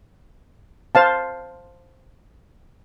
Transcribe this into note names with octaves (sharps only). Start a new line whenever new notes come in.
C5 F5 A5